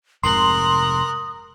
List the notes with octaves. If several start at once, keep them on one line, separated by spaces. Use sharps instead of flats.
F1 G#2 C3 A#4 C6 D#6 F#6